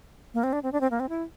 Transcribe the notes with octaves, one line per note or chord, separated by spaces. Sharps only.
A#3
C4
D4
C4
D4
C4
A#3
C4
E4